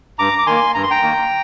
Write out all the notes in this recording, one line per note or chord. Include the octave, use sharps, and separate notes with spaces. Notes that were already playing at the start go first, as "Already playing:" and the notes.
G2 A#5 D6
D6
D#3 A#3 G#5 C6
G2 A#5
C6
G5 A#5
D#3 A#3